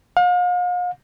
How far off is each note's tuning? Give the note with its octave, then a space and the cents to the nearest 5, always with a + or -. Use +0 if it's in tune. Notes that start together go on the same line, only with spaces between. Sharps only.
F5 +40